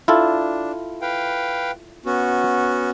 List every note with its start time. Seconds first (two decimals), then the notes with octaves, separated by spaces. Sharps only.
0.08 D4 E4 F4 A4
1.02 B4 F5 G5
2.05 B3 C#4 F#4